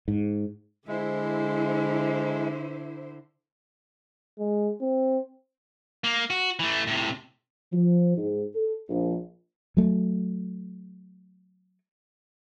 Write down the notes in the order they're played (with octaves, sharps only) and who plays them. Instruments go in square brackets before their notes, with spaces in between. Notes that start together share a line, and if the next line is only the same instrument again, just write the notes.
[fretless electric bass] G#2
[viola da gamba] D3 [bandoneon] G#3 [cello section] E4 C5
[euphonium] G#3
C4
[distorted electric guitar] A#3
F#4
E3 A3
A2 C3
[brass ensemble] F3
G#2
A4
A#1
[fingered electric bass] F#3 A3